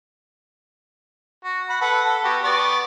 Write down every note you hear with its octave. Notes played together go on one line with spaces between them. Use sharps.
F#4
F#5 B5
A4 B4 F#5
A4
B3 F#4 G4
B3 D5 C#6